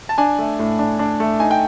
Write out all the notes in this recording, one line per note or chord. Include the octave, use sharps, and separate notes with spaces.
A5
D4 G#5
A3
A2
D4
D4
A3
D#4 G#5
G5